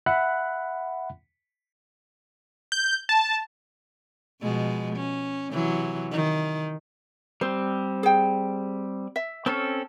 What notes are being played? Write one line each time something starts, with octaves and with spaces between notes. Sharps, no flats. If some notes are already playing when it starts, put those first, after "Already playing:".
E5 F#5 B5 F#6
G6
A5
B2 F3 G#3
C#4
C3 E3 F#3
D#3
G3 C4 C5
G#4 G5
E5
C4 C#4 A4 C#5 A5